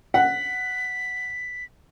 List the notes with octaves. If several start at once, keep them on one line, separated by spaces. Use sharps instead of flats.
F#5 B6